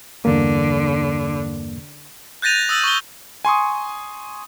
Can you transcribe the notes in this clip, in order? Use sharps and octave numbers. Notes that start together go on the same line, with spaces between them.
E2 G2 D3 A#3
F#6 G6 A6 A#6 D#7 F7
D#6 E6 A6 F#7
C#6 G7
G#5 C6 C#6 D#6